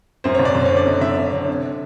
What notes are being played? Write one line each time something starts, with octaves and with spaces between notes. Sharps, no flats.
F#2 C5
C#5
F#1
D5
F#1 C5
C#5
D3
D5
F#2 D#5
F#1 E5
F#1 E5
D3
C3